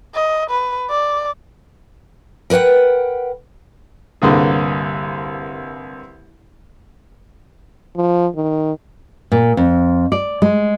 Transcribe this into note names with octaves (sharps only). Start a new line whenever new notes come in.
D#5
B4
D5
A#4 B4 C#5 F#5 G5
C2 G2 D3 A#3 G#4
F3
D#3
A#2
F2
D5
G#3